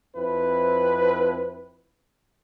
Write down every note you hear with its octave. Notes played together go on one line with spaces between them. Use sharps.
F2 C4 E4 B4